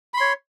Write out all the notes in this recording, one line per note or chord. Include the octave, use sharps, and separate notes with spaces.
C#5 B5 C6